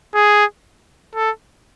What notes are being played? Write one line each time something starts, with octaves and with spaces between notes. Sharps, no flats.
G#4
A4